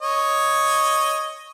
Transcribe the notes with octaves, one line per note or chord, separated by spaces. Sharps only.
C#5 D#5